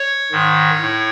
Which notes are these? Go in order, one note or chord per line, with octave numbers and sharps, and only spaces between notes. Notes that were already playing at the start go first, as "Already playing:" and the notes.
Already playing: C#5
G#2 D#3
A2